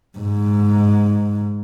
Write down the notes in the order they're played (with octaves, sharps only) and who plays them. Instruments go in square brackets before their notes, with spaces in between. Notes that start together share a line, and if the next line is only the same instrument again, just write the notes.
[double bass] G#2